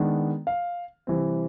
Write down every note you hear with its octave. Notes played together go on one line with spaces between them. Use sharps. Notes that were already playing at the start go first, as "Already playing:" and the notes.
Already playing: D#3 G#3 B3 D4
F5
C3 E3 G3 C4